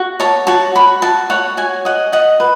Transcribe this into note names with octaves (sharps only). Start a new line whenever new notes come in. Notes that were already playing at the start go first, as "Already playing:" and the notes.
Already playing: F#4
C#5 A5
F#4 A5
F#4 B5
F#4 A5
C#5 F#5
F#4 G#5
D#5 F#5
D#5 F#5
B4